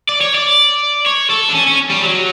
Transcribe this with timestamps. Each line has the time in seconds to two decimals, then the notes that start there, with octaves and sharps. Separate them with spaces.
0.09 D5
0.21 C#5
0.35 D5
1.07 C#5
1.30 A4
1.50 D4
1.55 C#4
1.68 C#4
1.91 G3
2.04 F#3